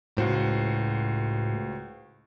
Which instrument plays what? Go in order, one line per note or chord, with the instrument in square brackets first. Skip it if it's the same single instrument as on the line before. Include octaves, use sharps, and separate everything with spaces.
[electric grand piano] C#2 F#4 C5 [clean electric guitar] A2